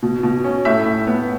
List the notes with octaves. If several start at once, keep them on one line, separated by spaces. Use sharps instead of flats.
B2
B2
C#4
A2 E5
A2
B3